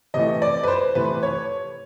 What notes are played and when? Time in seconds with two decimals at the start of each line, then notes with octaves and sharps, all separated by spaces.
0.14 C3 E3 A3 D#5
0.42 D5
0.64 B4
0.68 C5
0.95 C3 E3 A3 B4
1.23 C#5